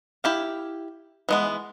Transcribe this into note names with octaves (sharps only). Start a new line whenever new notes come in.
E4 G4 F5
E3 G#3 B3